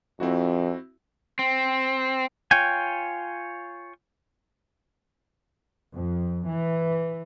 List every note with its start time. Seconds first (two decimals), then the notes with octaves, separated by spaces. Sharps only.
0.20 F2 C4 E4 F#4
1.39 C4
2.51 F4 C#5 G5 G#5
5.94 F2
6.46 E3